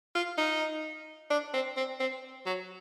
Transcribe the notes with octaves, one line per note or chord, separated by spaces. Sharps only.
F4
D#4
D4
C4
C4
C4
F#3